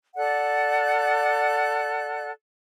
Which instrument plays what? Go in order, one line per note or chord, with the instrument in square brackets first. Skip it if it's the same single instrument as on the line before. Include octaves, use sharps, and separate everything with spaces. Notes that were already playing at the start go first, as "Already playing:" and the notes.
[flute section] A4 D5 F#5 F#6